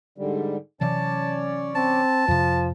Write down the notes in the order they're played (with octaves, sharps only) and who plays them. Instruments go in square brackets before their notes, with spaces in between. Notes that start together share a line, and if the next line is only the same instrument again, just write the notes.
[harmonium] G#2 D3 G3
[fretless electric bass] C3 E3 F#3 [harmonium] C#4 C#5 D5 [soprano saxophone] A5
[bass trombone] C4 [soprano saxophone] A5
[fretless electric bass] F2 C3 [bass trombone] F3